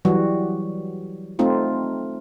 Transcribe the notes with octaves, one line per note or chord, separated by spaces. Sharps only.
E3 F#3 G3 F#4
A3 C4 D#4 F4